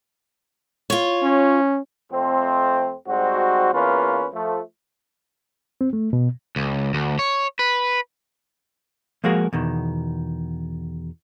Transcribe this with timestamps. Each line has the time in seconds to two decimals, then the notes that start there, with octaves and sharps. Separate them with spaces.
0.90 F4 C#5
1.23 C#4
2.11 F2 A3 C4
3.07 G#2 G3 C4 F#4
3.73 E2 A#3 C#4 F4 B4
4.33 F3 A3
5.81 C4
5.93 A3
6.13 B2
6.56 C#2
6.94 D2
7.19 C#5
7.59 B4
9.24 F3 G#3 A#3 F#4 G#4 A#4
9.53 E2 B2 D#3